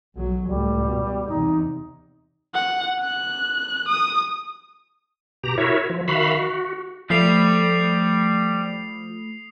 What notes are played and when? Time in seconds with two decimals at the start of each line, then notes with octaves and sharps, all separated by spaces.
0.16 B1 F#3
0.47 C#2 A2 G3
0.85 B2
1.29 E2 C3 D#4
2.54 F#5
3.00 F#6
3.89 D#6
5.44 B2 G4 A#5
5.58 E4 F#4 A#4 C#5 E5
5.90 F3
6.08 D#3 F#4 E5 F5 B5
6.39 F#4
7.10 F3 G3 A3 B5 D#6 C7 F7